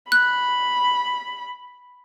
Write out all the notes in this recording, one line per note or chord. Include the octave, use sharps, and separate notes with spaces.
B5 F#6